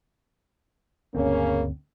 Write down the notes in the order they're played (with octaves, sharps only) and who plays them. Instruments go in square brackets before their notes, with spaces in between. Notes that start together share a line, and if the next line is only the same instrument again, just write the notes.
[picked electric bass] G1 D2 C4 [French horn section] C#3 A#3 C#4